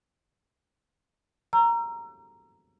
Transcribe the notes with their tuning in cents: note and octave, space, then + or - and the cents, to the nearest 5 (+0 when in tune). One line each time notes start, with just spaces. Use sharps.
A#5 +0 E6 +40